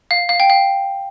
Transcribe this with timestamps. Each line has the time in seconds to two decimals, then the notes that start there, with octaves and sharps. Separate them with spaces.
0.11 F5
0.29 F5
0.40 G5
0.50 F5